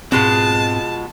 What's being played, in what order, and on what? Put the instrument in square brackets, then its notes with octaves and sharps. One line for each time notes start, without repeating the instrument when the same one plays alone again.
[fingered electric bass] G#2 C4 [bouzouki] B2 G#3 F4 [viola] A5